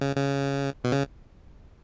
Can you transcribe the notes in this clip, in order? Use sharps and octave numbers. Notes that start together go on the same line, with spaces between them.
C#3
C#3
B2
C#3